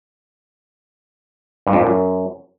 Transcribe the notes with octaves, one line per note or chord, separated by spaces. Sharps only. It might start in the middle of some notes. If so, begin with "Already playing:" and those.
G2
F2
A#2
F#2